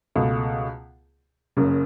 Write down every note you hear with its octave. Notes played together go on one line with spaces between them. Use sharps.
C#2 B2 A3
F#1 F#2 C#3